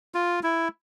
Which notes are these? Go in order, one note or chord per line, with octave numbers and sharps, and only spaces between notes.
F4
E4